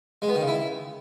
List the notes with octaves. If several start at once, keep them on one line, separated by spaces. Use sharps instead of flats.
G#3
B3
D#3
C#3
E4